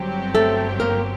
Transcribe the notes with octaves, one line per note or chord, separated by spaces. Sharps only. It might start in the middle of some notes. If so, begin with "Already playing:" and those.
Already playing: G1 G2 F#3 C4 G4
A3 A4
A#3 A#4